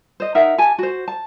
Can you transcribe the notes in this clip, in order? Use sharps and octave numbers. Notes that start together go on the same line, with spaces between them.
C5 D#5
D#4 A#4 E5 F#5
G4 G#5 A5
F#4 C5
A5